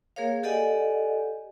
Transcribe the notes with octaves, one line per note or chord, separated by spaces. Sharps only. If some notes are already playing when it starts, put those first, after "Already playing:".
A#3 G#4 A#4 C#5 F5
G4 A4 D5 D#5 F#5 G#5